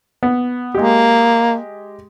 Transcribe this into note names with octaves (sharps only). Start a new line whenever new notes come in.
B3
G#3 A#3 G4